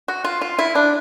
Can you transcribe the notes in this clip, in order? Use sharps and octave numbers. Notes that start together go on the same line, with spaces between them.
F#4
F4
F4
E4
D4